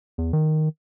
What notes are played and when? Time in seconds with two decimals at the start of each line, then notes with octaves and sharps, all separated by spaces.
0.18 E2
0.33 D#3